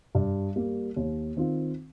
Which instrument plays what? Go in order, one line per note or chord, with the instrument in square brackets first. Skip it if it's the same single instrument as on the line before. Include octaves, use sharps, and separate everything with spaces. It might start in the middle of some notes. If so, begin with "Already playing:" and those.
[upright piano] G2
G3 A#3
D#2
D#3 C4 F4